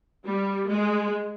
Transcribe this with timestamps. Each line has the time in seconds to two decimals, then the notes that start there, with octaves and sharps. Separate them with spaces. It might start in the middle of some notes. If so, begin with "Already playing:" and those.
0.24 G3
0.68 G#3